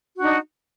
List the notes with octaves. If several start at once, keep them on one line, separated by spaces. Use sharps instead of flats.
D4 D#4 F#4